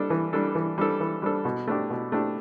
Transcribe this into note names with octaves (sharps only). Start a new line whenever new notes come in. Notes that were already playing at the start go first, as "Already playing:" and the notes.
Already playing: G3 D4 A4
E3
G3 D4 A4
E3
G3 D4 A4
E3
G3 D4 A4
B2
A3 D4 G4
B2
A3 D4 G4